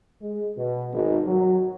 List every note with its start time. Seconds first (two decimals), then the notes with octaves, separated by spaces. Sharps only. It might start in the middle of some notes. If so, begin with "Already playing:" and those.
0.21 G#3
0.57 B2
0.93 G#1
1.27 F#3